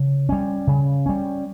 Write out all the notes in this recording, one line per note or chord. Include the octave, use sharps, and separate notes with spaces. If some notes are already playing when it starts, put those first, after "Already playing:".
Already playing: C#3
G3 C#4
C#3
G3 C#4